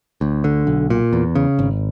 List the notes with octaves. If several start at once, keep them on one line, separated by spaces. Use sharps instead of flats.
D2
D3
B1
A#2
E2
C#3
G#1